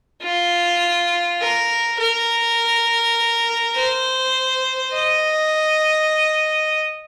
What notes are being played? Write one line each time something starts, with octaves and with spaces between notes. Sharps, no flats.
F4
A#4
A#4
C5
D#5